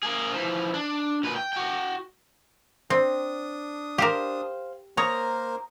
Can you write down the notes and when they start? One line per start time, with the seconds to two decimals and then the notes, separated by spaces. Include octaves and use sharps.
0.03 A#3 G#4
0.32 E3 F3
0.74 D4
1.23 A#2 B4
1.36 G5
1.53 F#4 G5
2.90 C4 D4 D#6
3.98 G4 A#4 C5 F5
4.97 A#3 A#4 C5 C#5 A#5 D#6